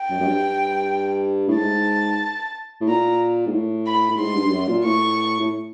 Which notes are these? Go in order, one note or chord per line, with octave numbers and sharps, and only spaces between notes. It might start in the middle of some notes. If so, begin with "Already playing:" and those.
Already playing: G5
F#2
F#2
G2
A2
G#2 A5
A2
A#2 A#5
G#2
A2
B5
A2
G#2 C6
G2
G2
F#2
A#2
A2 C#6
A2